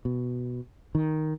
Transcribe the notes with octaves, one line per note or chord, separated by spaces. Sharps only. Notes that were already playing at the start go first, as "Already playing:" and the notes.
B2
D#3